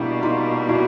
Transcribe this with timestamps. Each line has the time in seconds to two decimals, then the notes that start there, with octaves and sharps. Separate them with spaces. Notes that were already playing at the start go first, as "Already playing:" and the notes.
Already playing: B2 G3 A#3 D4 E4
0.23 D#4 F4
0.69 E4 F#4